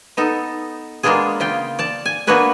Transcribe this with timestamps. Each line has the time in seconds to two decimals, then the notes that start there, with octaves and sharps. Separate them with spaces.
0.17 B3 D#4 A4
1.03 G#3 A#3 B3 D4 F4 G#4
1.40 C#3 F4 G5
1.79 D5 A5
2.06 G#5
2.27 A#3 B3 D4 F#4 B4 G#5